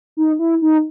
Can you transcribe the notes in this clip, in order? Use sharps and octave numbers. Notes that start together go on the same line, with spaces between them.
D#4
E4
D#4